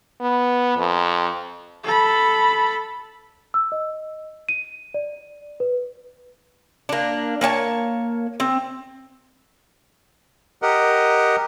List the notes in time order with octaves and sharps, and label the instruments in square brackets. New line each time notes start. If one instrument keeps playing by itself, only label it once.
[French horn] B3
F2
[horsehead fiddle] A4 B5
[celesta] E6
D#5
D#7
D5
B4
[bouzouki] A#3 D4
A#3 C#5 G5 A5
C4
[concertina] G4 A#4 D#5 F#5